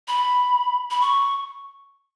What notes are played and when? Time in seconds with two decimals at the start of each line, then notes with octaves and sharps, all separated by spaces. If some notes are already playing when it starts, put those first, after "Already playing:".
0.08 B5
0.91 B5
1.01 C#6